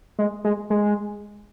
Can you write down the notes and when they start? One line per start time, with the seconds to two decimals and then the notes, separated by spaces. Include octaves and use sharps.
0.19 G#3
0.44 G#3
0.70 G#3